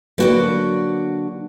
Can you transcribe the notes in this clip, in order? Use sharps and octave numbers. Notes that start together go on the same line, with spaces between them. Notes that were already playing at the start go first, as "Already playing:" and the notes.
D3 F#3 A#3 F#4 B4 D5